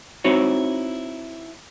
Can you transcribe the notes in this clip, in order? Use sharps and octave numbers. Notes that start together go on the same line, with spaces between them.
C4 D#4 E4 F#4 C#5